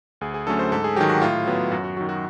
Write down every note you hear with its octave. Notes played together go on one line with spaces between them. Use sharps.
D2 G#4
G#4
D3 F#3 A3 C#4 A4
C5
G#2 A4
G#4
D#3 F#3 G4
F#4
A2 F4
F#3 B3
F#2 F#4
F#4
D#3 F#3 F#4
F#4